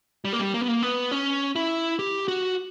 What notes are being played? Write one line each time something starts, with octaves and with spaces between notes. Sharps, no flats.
G3
A#3
G3
A#3
B3
A#3
B3
C#4
E4
G4
F#4